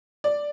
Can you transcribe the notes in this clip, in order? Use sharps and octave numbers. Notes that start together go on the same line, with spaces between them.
D5